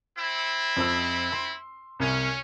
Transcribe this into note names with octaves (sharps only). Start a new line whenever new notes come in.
C4 E4
F2 C5 E6
C6
C2 C#4